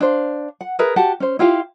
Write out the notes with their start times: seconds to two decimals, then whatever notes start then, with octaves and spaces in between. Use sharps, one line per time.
0.01 D4 C5 F5
0.61 F#5
0.79 G#4 A#4 B4 E5
0.96 F#4 G4 F#5 A5
1.20 C#4 C5
1.39 E4 F4 G4 F5